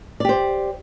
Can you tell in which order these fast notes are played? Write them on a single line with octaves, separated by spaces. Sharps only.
D5 G4 C5